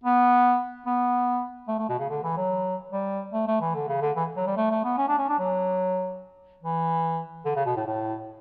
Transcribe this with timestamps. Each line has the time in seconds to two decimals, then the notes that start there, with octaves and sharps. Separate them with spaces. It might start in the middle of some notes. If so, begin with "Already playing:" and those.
0.04 B3
0.86 B3
1.68 A3
1.79 A3
1.89 B2
1.99 C#3
2.10 D3
2.23 E3
2.37 F#3
2.92 G3
3.33 A3
3.47 A3
3.61 E3
3.75 D3
3.88 C#3
4.01 D3
4.16 E3
4.37 F#3
4.47 G3
4.57 A3
4.71 A3
4.84 B3
4.98 C#4
5.09 D4
5.18 C#4
5.29 D4
5.39 F#3
6.63 E3
7.45 D3
7.56 C#3
7.66 B2
7.76 A2
7.87 A2